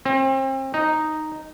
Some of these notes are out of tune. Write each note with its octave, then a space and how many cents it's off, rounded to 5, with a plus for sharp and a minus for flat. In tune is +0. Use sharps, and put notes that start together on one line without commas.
C4 +35
D#4 -5